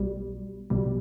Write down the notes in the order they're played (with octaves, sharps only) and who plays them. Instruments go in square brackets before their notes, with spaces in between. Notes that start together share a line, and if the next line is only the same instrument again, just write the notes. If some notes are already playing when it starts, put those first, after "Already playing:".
Already playing: [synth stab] B1 B2 G3
B1 B2 G3